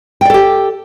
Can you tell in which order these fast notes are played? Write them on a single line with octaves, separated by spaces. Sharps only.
G5 D5 A4 G4